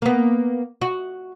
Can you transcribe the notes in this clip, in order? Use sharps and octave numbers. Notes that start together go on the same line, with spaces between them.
A#3 B3
F#4